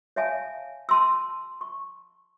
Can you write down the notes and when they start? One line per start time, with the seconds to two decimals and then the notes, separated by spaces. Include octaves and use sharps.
0.16 C#5 E5 F5 G#5 A5
0.89 A5 C6 E6
1.61 C#6